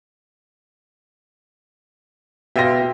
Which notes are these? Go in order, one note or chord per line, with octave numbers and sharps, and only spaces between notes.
B2 G4 E5 F5 C6 A#6